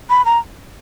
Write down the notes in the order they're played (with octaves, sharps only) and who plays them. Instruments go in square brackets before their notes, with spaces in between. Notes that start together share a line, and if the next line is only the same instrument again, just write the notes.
[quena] B5
A#5